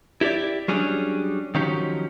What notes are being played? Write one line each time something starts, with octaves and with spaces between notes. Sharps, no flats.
E4 G4 A4 D5 E5
F#3 G3 C#4 D4 G#4
D#3 F3 F#3 C#4 D#4 G4